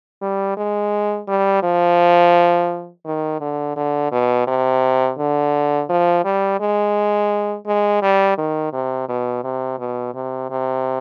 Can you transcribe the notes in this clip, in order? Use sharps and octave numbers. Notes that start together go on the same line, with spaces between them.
G3
G#3
G3
F3
D#3
D3
D3
B2
C3
D3
F3
G3
G#3
G#3
G3
D#3
C3
B2
C3
B2
C3
C3